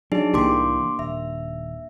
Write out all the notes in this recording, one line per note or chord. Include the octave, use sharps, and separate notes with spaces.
F#3 D4 D#4 G#4
C2 A2 E3 A#3 G4 A#4 C6 D6
D#1 E5